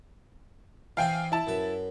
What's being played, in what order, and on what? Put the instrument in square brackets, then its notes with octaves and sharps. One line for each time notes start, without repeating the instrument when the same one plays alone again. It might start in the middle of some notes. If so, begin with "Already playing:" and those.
[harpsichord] E3 C4 D5 [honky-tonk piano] F5 G5 G#5
[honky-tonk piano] E4 A5
[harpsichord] F#2 B4